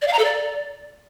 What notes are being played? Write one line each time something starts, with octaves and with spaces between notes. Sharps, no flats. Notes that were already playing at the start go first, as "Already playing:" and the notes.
D5
F5
A#5
A4
D5